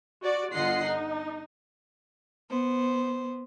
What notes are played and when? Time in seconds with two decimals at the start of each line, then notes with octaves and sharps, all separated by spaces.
0.22 F#4 D5
0.53 G1 D3 F4 D#5 F#5 C7
0.86 D#4
2.49 B3 C5